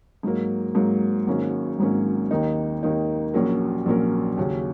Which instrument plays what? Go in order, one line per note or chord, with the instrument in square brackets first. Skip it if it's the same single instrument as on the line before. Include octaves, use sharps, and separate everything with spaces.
[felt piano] G#2 F#3 A#3
G#2 F#3 A#3
G#1 G#2 F#3 A#3 C#4
G#1 G#2 F#3 A#3 C#4
D#2 D#3 A#3 D#4
D#2 D#3 A#3 D#4
A#1 A#2 F#3 C#4 A#4
A#1 A#2 F#3 C#4 A#4
D#2 C#3 F#3 C#4